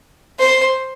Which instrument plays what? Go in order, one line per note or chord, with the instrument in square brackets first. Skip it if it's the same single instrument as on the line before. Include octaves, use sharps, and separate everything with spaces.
[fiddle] C5